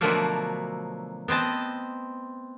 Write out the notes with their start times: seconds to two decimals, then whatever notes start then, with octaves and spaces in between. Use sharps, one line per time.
0.01 B2 D3 F3 F#3 A3 A#3
1.28 B3 C4 D#5 A5